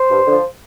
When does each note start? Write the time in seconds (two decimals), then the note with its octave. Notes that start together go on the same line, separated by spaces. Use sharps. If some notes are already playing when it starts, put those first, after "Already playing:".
Already playing: C5
0.10 G2
0.26 D3 F3